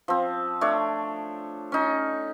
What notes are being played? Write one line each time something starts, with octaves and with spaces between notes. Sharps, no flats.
F3 C4
A3 D4 C#5
C#4 D#4